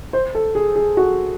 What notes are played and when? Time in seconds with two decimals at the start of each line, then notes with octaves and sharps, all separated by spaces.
0.13 C5
0.35 A4
0.55 G#4
0.76 G#4
0.97 F#4